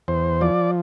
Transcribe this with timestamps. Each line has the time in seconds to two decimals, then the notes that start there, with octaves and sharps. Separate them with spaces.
0.08 E2 C5
0.41 F3 D5